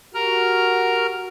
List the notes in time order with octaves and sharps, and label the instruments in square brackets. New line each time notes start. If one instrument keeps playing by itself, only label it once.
[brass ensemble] F#4 G4 [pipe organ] A#4 A#5 F6